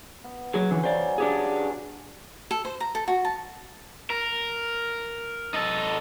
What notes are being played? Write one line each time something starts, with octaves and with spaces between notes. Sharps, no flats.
B3
F#3 G#4
D3 E3 C#4
C#3 F#3 C5 D5
D4 G4 G#4
B4
A4
C5
A#5
A4
F#4
A5
A#4
D#4 A4